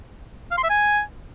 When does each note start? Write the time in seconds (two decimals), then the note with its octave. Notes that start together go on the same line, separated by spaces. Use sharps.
0.51 F5
0.57 C6
0.63 E5
0.70 G#5